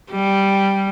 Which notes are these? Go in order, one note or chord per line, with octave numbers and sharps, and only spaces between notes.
G3